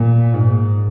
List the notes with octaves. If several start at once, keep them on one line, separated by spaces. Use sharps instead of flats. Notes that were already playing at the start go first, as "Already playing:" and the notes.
Already playing: A#2
G#2